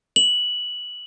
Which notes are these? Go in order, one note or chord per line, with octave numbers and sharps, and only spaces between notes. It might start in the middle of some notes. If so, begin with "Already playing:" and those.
F#7